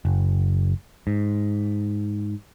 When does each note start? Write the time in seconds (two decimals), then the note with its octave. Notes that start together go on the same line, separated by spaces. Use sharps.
0.05 F#1
1.07 G#2